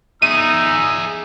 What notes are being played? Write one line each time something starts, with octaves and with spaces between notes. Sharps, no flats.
D#4 G#4 E5 E6 D#7